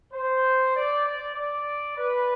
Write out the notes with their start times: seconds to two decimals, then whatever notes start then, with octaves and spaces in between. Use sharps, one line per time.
0.13 C5
0.75 D5
1.06 D5
1.36 D5
1.98 B4